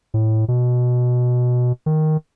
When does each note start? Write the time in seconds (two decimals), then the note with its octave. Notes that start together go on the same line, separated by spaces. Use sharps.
0.14 A2
0.48 B2
1.86 D#3